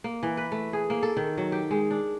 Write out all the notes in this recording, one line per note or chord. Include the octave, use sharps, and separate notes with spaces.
A#3
E3
B4
A3
G#4
A#3
A4
D#3
F#3
G4
G#3
D4